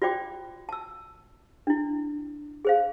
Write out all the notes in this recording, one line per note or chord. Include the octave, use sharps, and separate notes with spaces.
F4 F#4 C5 D5 G5 D6
A5 E6
D4 E4
G#4 C5 F5